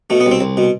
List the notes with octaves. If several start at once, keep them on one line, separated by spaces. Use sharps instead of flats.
B2 A3
B3
C2
C4
C2
B2